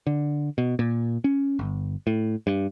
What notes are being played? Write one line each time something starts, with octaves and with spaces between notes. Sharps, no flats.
D3
B2
A#2
C#4
G1
A2
G2